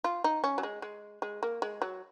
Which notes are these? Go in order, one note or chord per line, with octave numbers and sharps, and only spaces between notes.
F4
D#4
C#4
F#3
G#3
G#3
G#3
A#3
G#3
F#3